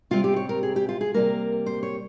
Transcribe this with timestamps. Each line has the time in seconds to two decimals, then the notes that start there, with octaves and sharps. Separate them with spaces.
0.11 C3 G3 C4 F4
0.24 G4
0.36 C#5
0.49 A#4
0.63 G#4
0.76 G4
0.89 F4
1.01 G#4
1.14 C3 G3 A#3 A#4
1.66 C5
1.83 C#5